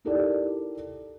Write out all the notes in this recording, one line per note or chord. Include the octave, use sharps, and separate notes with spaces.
D#4 E4 G4 A4 A#4 D5